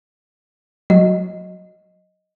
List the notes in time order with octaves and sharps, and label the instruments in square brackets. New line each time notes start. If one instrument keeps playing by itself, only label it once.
[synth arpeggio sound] F#3 [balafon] D#5